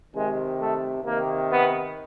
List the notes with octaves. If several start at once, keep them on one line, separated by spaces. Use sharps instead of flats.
C3 D#3 G#3
A3
C3 D#3 A#3
B3